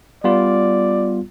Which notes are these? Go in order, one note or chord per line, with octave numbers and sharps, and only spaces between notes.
G3 B3 F4 D5